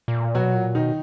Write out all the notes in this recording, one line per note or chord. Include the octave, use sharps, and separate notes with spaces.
A#2
B2 F#3 F#4
A#2
B2 D#3 D#4